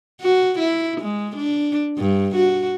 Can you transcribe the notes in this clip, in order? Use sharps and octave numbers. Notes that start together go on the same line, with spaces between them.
F#4
E4
G#3
D4
G2
F#4